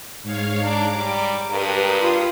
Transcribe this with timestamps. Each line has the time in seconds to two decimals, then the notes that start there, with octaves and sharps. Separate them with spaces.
0.23 G#2 C#5 F5
0.63 D4 A#5 D6
0.95 G3
1.51 G2 G4 A#4 B4 D#6
2.01 F4